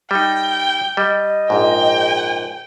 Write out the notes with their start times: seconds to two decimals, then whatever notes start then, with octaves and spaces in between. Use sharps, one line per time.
0.11 G3 D#4 G5
0.97 G3 D#5
1.50 A#1 G#2 G5